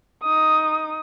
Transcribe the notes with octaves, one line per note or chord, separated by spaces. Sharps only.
D#4 D#6